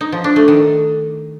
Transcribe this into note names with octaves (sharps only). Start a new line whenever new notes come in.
D#4
F3
D4
A3
D#3